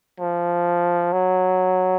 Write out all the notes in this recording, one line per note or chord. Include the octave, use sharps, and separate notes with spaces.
F3
F#3